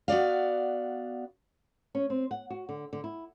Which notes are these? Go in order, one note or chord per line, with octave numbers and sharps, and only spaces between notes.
B3 F#4 D5 F5
C#4
C4
F#5
F#4
D3
D3
E4